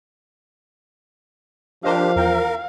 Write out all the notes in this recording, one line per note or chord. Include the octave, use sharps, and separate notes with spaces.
F3 D4 G4 A#4 C5 D#5 F5
E2 A#4 G5